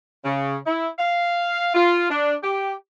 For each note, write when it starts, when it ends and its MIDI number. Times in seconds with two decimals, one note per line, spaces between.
0.25 0.57 49
0.66 0.88 64
0.98 1.71 77
1.74 2.08 65
2.10 2.34 62
2.43 2.73 67